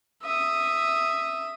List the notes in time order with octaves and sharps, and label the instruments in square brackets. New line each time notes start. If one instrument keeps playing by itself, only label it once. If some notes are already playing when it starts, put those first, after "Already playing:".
[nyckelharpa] E5 D#6